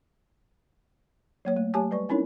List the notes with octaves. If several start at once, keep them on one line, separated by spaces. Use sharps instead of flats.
F#3 A#3 C#5
A3
F#3 A3 G4 C#5 G#5 A5
G3 B4 D5 C#6
C4 C#4 D#4 E4 A#4 C#5